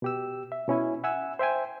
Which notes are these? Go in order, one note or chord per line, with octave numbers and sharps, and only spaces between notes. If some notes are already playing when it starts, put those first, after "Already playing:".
B2 G4 E6
E5
B2 C#4 E4 G#5
E5 F#5 G#5 E6
C5 E5 G5 G#5